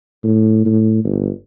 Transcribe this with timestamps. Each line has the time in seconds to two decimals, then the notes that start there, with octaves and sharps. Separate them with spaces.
0.24 A2
0.65 A2
1.05 G1